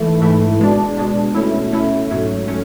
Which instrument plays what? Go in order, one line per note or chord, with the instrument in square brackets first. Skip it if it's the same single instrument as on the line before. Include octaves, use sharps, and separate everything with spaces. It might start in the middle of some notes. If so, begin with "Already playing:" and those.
Already playing: [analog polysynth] G#2 E3 A3 E4
G#2 E3 A3 E4
B2 G#3 D4
B2 G#3 D4
B2 A3 C#4 E4
B2 A3 C#4 E4
G#2 F#3 A3 C#4
F#3 A3 C#4